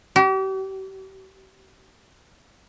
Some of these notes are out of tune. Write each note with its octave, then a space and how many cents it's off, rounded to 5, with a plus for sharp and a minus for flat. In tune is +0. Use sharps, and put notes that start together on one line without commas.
G4 -40